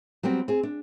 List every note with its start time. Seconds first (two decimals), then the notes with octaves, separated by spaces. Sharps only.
0.23 F#3 G3 B3 C4
0.48 C4 G#4
0.63 D4